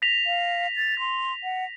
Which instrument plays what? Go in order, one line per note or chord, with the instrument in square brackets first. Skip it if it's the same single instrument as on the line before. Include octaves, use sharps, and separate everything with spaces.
[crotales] A#6 B6 F7
[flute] F5
A6
C6
F#5